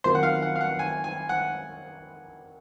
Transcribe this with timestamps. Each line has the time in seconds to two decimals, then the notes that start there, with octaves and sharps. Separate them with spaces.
0.04 D#3 F#3 C4 F4 A#4 C5
0.15 F#5
0.23 F5
0.43 F#5
0.56 F5
0.61 F#5
0.79 G#5
1.04 G#5
1.29 F#5